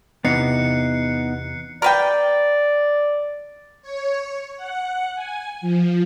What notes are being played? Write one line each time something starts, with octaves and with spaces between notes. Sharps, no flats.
E2 C3 E3 B3 D#4 F#6 C7 C#7
A#4 B4 D5 G5
C#5
F#5
G#5
F3